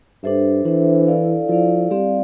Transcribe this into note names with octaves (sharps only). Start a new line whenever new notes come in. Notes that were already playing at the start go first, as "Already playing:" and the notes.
G2 D4 A4 C5 E5
E3 D4 A4 C5 E5
E4 A4 D5 F5
F3 E4 A4 D5 F5
G3 C4 G4 D5 F5